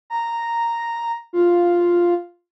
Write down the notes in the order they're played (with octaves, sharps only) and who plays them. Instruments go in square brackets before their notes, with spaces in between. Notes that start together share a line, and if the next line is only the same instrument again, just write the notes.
[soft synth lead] A#5
F4